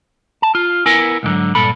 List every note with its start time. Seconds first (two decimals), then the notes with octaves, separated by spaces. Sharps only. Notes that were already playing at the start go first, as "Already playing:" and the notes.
0.42 A5
0.55 F4
0.86 B3 E4 A#4 G#5
1.23 C2 G#2 D3 F#3
1.55 G2 A#2 A4 B5